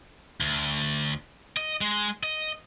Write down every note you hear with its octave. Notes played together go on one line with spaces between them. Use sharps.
D2
D#5
G#3
D#5